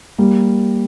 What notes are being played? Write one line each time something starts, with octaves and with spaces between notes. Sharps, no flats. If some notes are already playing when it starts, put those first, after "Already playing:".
G3 A#3